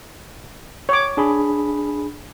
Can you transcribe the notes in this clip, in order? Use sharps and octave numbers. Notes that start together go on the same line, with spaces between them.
C#5 D6
D4 G#4 B5